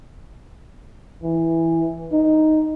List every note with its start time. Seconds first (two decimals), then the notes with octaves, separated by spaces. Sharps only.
1.23 E3
2.12 D#4